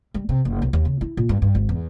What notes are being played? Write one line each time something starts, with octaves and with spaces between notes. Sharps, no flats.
G3
C3
F#1
B1
D#2
C#3
E4
A#2
G2
G2
G#1
E2